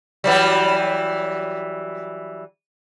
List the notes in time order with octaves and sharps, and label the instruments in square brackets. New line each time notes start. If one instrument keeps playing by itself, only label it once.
[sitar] E3 F#3 G3